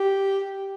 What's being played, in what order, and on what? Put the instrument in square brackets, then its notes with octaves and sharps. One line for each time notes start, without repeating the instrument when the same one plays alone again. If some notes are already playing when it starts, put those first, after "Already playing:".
Already playing: [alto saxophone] G4